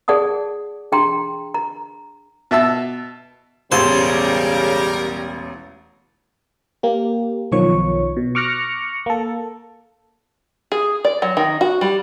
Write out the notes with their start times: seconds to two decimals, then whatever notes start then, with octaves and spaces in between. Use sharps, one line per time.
0.08 G#4 D5 F#5 A5 D#6
0.92 D4 G#4 G5 A#5 C6
1.54 A#5
2.51 B2 E5 A5 E6
3.72 E1 A1 C#3 G3 G4 A#4 C5
6.83 A#3 G4
7.52 B1 D#3 F3 C#5 C#6
8.17 B2
8.35 C#6 D6 F6 F#6 A#6 C#7
9.06 A#3 A4
10.72 G#4
11.05 D5
11.22 F#3
11.37 D#3
11.61 F#4
11.81 G3